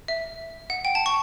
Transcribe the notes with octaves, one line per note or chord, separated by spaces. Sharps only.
E5
F#5
G5
A5
C#6